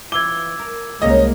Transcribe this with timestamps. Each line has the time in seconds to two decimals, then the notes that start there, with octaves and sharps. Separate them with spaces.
0.12 E3 F4 D6 E6 G#6 G7
0.59 A#4
1.02 C2 G#3 A#3 C#4 D#4 C#5 D#5